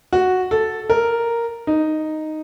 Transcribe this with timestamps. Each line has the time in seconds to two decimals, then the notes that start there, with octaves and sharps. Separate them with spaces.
0.13 F#4
0.51 A4
0.90 A#4
1.67 D#4